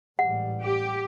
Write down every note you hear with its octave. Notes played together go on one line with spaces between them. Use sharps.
A1 G#2 G3 F#5
G4